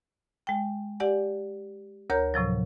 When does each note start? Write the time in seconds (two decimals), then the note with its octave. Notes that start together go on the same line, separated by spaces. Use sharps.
0.47 G#3 G5
1.00 G4 D5 F#5 G#5
2.10 D2 A#4 C#5 A#5 G6
2.34 A2 C3 F3 F#3